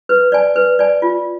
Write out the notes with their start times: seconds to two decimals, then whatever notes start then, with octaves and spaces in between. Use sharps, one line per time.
0.09 B4
0.32 D5 G#5
0.56 B4
0.79 D5 G#5
1.02 F4